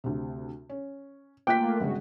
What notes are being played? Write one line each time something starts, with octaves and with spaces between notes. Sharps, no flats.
D2 C3
C#4
A3 A#3 F4 G5 D6 F#6 B6
G1 C#3 G#3 F#4